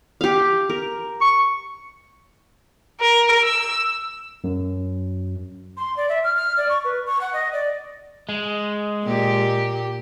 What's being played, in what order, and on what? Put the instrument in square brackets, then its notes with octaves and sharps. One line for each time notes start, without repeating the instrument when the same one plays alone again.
[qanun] G4 F5
A#4
[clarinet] C#6
[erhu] A#4
E6
[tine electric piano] F#2
[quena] C6
D5
E5
F6
F6
D5
C#6
B4
C#6
F#5
D#5
D5
[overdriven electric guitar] G#3
[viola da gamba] A#2 G4